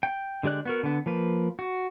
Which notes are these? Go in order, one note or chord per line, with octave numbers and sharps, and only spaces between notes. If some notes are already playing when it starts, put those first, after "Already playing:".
G5
D3 G#3 G4 D5 F#6
B3 F#4 A#4
D3 B3
F3 A#3 B4
F#4